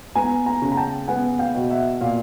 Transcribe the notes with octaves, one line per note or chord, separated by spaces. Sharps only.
B3 G#5 A#5
G#5 A#5
C#3
A#5
G5 A5
B3 F#5 G#5
F5 G5
B2
E5 F#5
A#2 F5